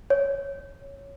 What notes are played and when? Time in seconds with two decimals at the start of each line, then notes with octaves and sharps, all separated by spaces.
0.10 C#5